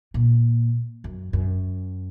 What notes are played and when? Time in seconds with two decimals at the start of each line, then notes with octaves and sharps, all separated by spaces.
0.14 A#2
1.04 F#2
1.33 F#2